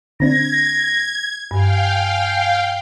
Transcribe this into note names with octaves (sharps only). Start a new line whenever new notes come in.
D3 C4 D4 G#6 A#6
G2 F5 G5 G#5